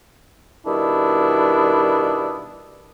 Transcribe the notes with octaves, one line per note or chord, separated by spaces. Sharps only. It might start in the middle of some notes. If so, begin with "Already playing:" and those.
B2 D#3 G3 B3 D4 E4